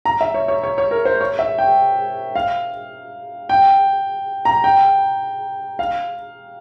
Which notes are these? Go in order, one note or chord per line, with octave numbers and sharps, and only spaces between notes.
A#5
E5
C#5
C#5
C#5
C#5
A#4
C5
C#5
E5
G5
F5
G5
A#5
G5
F5